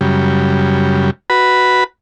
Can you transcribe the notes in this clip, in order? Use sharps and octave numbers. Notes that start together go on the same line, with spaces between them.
F#2 C#3 G3
F#4 B4 B5